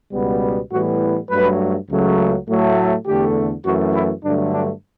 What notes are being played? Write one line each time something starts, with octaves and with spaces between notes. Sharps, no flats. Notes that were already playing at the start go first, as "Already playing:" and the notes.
C#2 B2 G3 B3
A2 E3 G3 B3 F#4
G2 F#3 A3 B4
C#2 C#3 F#3 A3
A2 F#3 A3
E2 D3 A3 G4
F#2 E3 A3 F#4
E4
G2 D3 F#3 A3 D4
D4